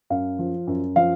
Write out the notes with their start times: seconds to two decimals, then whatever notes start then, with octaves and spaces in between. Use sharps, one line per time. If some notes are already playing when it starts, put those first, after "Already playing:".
0.10 F#2 F5
0.39 F3
0.67 F#2
0.96 F3 F5